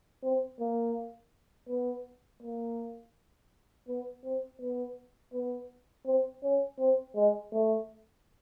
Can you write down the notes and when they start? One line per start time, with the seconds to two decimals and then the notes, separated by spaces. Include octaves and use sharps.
0.23 C4
0.60 A#3
1.69 B3
2.43 A#3
3.88 B3
4.24 C4
4.61 B3
5.33 B3
6.06 C4
6.43 C#4
6.79 C4
7.15 G#3
7.52 A3